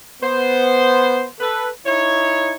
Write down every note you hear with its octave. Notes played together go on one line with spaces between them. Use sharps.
B3 C5
A4 B4
D#4 E4 C#5